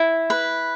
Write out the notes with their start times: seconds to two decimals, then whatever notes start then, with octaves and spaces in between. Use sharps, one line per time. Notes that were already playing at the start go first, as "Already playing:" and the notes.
Already playing: E4
0.30 B4